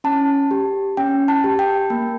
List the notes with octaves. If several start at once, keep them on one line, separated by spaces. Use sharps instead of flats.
C#4 A5
G4
C#4 G5
A5
G4
G5
A#3